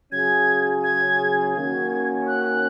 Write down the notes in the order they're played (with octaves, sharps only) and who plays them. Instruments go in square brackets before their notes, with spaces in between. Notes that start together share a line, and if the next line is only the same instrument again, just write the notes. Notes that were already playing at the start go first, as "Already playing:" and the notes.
[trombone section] C#3 F#3 C#4 G#4 [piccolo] G#6
[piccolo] G#6
[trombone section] D#3 A#3 C#4 F#4 [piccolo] G#6
[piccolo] F#6